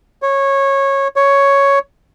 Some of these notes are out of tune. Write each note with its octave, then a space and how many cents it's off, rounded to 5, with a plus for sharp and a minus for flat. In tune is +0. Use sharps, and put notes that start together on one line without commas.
C#5 -15
C#5 +5